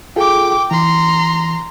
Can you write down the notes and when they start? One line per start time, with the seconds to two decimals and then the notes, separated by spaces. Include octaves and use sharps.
0.16 F4 G#4 A4 G5 D6
0.71 E3 A#5 C6